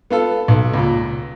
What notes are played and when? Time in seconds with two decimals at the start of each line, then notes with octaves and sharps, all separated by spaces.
0.10 B3 F4 A4
0.48 B1
0.73 C#2 A#2